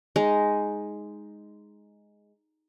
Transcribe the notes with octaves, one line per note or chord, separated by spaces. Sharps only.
G#3 D#4